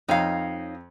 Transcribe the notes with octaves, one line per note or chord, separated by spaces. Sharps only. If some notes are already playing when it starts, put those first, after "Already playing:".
F2 D#4 C#5 F5